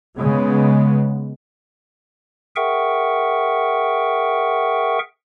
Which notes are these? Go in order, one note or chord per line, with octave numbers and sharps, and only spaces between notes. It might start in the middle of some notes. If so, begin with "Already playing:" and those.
C#3 G#3 B3
G#4 A#4 E5 F#5 G5 C#6